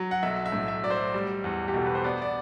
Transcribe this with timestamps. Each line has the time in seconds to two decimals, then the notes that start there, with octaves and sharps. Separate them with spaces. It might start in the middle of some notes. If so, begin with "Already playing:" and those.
Already playing: F#3
0.11 F#5
0.23 B1 E5
0.46 E5
0.52 A2
0.68 E5
0.83 F#3 D5
0.90 C5
1.14 G3
1.44 E2
1.68 G4
1.74 B2 A4
1.86 B4
1.95 C5
2.04 B3 D5
2.22 D5